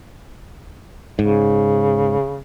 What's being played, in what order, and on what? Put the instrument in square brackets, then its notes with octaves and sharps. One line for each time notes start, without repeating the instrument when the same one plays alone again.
[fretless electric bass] G#2 [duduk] C#3